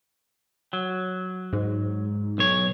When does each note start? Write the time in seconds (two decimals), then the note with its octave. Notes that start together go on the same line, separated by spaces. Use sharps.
0.73 F#3
1.53 G#2
2.38 B1 C#5